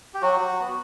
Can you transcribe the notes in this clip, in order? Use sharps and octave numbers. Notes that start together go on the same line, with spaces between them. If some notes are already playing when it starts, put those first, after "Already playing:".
G4
F#3 F#4
B3 F#4